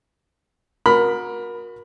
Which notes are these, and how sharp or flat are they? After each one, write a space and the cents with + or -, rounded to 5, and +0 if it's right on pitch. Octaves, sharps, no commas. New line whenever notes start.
F#4 -30 A#4 +20 B5 +10